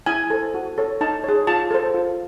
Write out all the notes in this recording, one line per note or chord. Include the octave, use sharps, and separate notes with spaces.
E4 G#5
A4 C5
F#4
A4 C#5
D#4 A5
G#4 C#5
F4 A5
A4 C5
F4